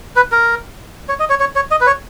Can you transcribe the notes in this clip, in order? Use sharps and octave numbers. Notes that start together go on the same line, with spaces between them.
B4
A#4
C#5
D#5
C#5
C#5
C#5
D#5
B4
C#5